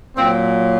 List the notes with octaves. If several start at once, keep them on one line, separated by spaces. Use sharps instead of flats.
A#2 F#3 C4